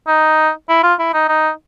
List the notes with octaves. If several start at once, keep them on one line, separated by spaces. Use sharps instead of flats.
D#4
E4
F4
E4
D#4
D#4